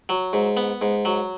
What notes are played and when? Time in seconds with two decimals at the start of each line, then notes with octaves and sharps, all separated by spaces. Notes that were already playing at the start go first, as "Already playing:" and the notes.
0.09 F#3
0.33 G#2
0.57 B3
0.82 G#2
1.05 F#3